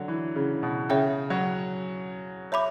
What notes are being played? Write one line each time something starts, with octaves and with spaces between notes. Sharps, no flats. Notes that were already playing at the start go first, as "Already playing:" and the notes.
Already playing: D3 F#3
E3
C#3
B2
C#3 C#5 E5 G5
F#3
C#5 E5 B5 D6